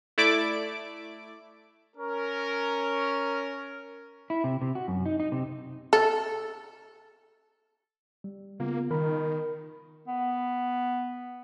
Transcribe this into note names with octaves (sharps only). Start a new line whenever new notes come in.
A3 E4 D5 D6 D7
C#4 A#4
E4
C3
C3
F#4
F#2
D#4
D#4
C3
A4
G3
C#3 A#3 B3 F4
D#3 A#4 B5
B3